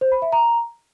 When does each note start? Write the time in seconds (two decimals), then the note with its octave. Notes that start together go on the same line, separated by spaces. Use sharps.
0.01 C5
0.12 B5
0.22 E5
0.32 A#5